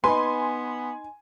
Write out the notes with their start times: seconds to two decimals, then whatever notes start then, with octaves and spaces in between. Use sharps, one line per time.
0.04 B3 D#4 B4 G#5 C6